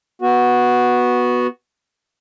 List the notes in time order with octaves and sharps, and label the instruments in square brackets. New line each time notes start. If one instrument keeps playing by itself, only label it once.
[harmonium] B3 F#4